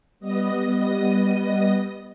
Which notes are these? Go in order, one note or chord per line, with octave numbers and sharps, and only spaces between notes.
G3 B3 D#5 D#6